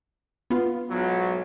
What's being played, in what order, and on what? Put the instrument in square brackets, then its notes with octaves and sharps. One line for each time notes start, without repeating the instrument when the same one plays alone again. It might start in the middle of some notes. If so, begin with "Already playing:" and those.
[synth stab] B3 F4
[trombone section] B1 G#2 F#3